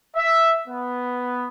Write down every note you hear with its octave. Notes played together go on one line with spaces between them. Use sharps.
E5
B3